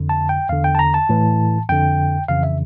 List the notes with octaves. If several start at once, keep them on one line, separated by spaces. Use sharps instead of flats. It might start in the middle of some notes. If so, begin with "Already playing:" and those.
Already playing: F2 D3
A5
G5
E2 D3 F5
G5
A5
A#5
A5
A2 E3
F2 D3 G5
F2 C#3 E3 F5
E5